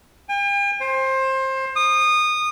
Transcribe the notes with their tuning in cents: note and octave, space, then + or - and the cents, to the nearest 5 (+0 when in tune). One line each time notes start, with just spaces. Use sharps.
G5 +45
C5 +20
D#6 -20